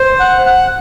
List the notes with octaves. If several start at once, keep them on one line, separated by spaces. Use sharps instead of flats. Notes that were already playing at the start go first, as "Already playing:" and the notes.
Already playing: C5
F#5
F#5